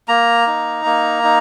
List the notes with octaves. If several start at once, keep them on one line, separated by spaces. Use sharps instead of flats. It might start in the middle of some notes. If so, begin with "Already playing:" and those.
A#3 A#5
D#4
A#3
D#4